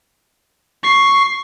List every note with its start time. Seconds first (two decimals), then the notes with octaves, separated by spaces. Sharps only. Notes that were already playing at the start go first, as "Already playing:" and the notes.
0.83 C#6 C7